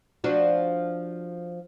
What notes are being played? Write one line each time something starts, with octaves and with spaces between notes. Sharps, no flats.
F3 D4 F#4